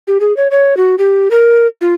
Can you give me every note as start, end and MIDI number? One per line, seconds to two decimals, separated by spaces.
0.07 0.18 67
0.20 0.35 68
0.37 0.48 73
0.51 0.77 73
0.77 0.95 66
0.98 1.28 67
1.31 1.67 70
1.81 1.94 65